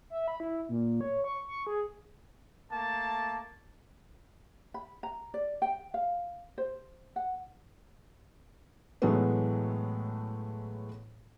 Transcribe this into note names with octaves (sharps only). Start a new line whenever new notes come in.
E5
B5
E4
A#2
C#5
C#6
C#6
G#4
A3 A#3 A5
B5
A#5
D5
G5
F5
C5
F#5
A2 E3 F#3 G#3 A3 B3